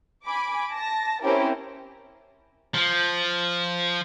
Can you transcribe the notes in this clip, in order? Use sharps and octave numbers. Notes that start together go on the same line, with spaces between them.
G#5 B5 D6
A5 A#6
A#3 C4 C#4 E4 G4 A#4
F3